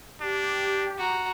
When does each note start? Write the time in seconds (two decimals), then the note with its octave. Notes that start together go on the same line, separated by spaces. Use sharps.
0.21 D4 G4
0.98 F#4 A#5